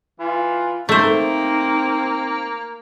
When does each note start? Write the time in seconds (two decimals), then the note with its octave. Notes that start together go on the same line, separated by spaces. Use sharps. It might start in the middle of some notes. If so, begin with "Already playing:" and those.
0.20 E3 F4
0.89 A3 A#3 C4 D#4 C5